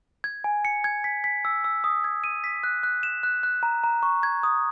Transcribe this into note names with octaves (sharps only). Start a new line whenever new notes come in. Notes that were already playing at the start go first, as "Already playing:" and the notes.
G#6
G#5
C#7
G#6
B6
B6
E6
E6
D#6
G#6
D#7
B6
F#6
F#6
E7
F#6
F#6
A#5
A#5
C#6
G#6
D#6